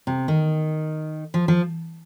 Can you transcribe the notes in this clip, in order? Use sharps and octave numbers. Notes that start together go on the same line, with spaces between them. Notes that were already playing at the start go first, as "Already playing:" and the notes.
C3
D#3
F3
F3